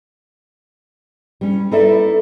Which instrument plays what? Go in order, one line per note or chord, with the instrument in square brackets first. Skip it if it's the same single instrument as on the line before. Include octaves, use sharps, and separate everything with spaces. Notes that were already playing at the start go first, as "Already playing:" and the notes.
[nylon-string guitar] G3 C#4
D#4 E4 A4 B4 D5 E5